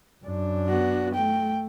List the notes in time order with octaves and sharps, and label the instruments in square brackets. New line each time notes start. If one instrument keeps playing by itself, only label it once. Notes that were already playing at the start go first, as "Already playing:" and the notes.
[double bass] F#2 D4
[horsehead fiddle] B3 F#4
[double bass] A3 [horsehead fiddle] G5